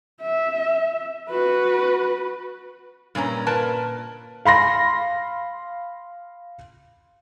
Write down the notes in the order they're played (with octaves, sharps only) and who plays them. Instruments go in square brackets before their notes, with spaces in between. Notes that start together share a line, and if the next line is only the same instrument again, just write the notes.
[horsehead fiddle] E5
F#4 B4
[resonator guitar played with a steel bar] G2 A#2 C#4 A#5
A#2 A#4 B4 A5
[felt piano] F5 B5 C6 A#6